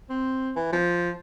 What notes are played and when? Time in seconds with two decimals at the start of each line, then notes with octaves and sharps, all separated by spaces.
0.10 C4
0.56 E3
0.73 F3